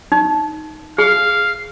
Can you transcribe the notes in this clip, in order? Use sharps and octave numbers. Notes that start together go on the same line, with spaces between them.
D#4
G#4 F5